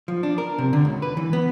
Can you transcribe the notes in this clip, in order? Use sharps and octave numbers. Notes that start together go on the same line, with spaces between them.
F3
D4
A#4
C3
D3
C#2
B4
E3
B3